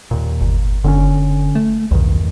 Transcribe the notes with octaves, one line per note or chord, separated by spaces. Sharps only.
D#2 A#2
G1
F#1 D3 C4 C#4
A3
B1 E2 G2 D#3